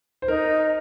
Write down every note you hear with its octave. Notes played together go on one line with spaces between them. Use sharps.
C5
D#4 A#4